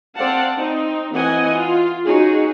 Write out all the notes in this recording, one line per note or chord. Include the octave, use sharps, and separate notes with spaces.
C4 D5 F5 F#5 A5
C4 D#4
E3 C4 D#5 F#5 G#5
F4
C#4 D#4 F#4 G#4